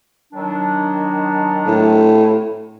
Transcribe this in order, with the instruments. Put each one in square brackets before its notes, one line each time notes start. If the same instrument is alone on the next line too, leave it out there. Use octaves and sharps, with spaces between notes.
[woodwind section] D#3 F#3 D4
[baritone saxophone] A2